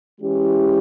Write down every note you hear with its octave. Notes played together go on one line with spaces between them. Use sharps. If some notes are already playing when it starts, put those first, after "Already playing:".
E3 G#3 C#4 E4 G4